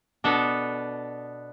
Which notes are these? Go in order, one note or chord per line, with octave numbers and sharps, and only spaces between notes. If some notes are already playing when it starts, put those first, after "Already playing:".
B2 B3 D4 A4